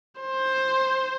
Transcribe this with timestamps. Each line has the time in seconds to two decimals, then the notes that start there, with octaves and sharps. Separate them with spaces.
0.21 C5